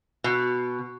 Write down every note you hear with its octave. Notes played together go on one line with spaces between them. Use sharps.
B2